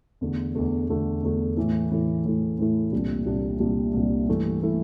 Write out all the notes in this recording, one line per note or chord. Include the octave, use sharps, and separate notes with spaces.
E2 D3 A3
E2 D3 A3
E2 D3 A3
E2 D3 A3
A2 E3 A3 E4
A2 E3 A3 E4
A2 E3 A3 E4
A2 E3 A3 E4
C2 A#2 G3 D4
C2 A#2 G3 D4
C2 A#2 G3 D4
C2 A#2 G3 D4
G2 E3 A3 E4
E3 A3 E4